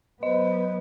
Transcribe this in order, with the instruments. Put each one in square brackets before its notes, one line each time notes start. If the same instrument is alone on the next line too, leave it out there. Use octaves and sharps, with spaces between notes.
[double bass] F#3 B3 [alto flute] C5 [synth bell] D#5